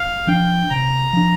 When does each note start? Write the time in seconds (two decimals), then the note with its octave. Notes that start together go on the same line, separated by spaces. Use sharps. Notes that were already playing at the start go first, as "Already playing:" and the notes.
Already playing: F5
0.27 F3 D4 G5
0.69 C3 A#5
1.13 F3 D4